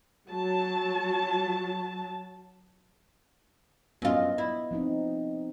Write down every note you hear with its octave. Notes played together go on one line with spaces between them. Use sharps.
F#3 A5
F#2 B3 D4 F4 D#5
E4
F3 C4 D#4